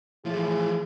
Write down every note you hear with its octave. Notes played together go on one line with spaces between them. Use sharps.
A2 E3 F3 G#4